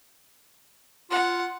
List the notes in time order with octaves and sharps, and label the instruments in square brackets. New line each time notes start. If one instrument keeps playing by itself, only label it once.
[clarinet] F4 [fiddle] F#5